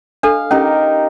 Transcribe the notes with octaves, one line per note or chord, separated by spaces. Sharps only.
D4 A4 F5
C#4 D#4 G4 A#4